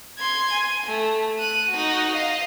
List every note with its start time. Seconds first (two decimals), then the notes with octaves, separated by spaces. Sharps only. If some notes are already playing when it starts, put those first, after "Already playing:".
0.19 C6 G#6
0.53 G#5
0.87 A3
1.39 F#6 D#7
1.70 D#4 F#4
2.13 D#5 F5